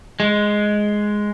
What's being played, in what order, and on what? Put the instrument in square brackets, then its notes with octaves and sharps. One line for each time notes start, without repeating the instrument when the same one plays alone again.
[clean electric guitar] G#3